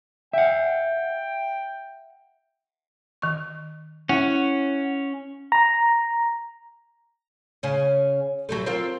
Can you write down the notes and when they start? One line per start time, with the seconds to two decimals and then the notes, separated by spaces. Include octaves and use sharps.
0.33 E5 F#5 G5
3.22 D#3 C#6
4.09 C#4 E4 F#5
5.52 A#5
7.63 C#3 C#4
8.49 F#3 G3 A3
8.66 C4 F4 A#4